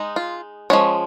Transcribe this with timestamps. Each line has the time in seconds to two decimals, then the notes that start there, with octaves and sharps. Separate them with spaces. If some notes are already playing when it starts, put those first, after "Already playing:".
Already playing: G#3 D#4
0.16 F4
0.70 F3 G#3 C#4 C#5